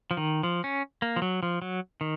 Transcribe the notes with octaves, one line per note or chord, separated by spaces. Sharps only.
F3
D#3
F3
C#4
A#3
F3
F#3
F3
F#3
D#3